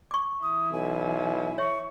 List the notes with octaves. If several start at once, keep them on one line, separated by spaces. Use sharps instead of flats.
C#6 D6
E3 E4 D#6
B1 G#5
C#5 E5 C#6